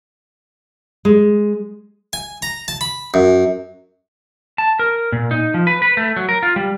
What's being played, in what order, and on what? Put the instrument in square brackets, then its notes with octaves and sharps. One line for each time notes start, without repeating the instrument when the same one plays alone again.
[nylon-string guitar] G#3
[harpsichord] G#5
A#5
A5
B5
F#2
[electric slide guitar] A5
A#4
A#2
D#4
F3
B4
B4
A3
F#3
A#4
F4
G3